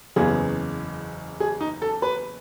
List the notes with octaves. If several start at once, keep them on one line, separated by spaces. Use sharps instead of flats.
F#1 E2 C#3 E3 G#4
G#4
D#4
A4
B4